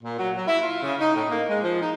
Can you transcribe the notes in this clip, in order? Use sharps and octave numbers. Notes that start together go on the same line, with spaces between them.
A#2
F#3
F#3
E4
F4
C#3
D#4
A2
A#3
G#3
F3
D#4